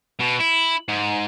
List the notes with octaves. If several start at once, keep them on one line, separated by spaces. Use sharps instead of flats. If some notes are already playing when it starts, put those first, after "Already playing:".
B2
E4
G#2